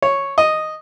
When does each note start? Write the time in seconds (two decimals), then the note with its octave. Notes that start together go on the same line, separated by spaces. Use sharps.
0.02 C#5
0.38 D#5